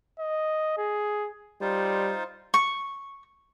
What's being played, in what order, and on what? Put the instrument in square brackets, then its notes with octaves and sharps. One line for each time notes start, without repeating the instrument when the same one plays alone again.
[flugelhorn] D#5
G#4
[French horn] G3 [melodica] D#4 F4 C5
[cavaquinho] C#6